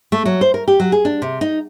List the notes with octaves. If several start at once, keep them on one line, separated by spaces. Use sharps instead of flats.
A3
F#3
C5
A#4
G4
F#3
G#4
D4
C3
D#4